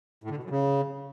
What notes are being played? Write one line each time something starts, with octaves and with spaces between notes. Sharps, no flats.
A2
D3
B2
F#2
C#3